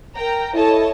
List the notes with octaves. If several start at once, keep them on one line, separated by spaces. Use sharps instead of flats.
A#4 G5 A#5
E4 A4 C#5 D#5 A5